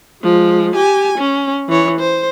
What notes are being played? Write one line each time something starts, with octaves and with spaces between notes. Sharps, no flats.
F3 G#3
G4 G#5
C#4
E3 C#5
C5